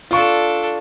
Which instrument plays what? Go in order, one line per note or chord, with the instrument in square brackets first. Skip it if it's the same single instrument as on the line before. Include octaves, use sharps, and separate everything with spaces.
[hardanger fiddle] D4 A4 [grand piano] F4 C#6